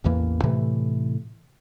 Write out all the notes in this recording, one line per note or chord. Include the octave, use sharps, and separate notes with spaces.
A1 E2 E3 A#3
A2 C3 E3 A3